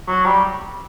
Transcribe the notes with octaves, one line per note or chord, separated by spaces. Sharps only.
F#3
G3